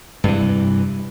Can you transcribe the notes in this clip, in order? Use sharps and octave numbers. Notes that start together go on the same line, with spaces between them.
G2 C3 E3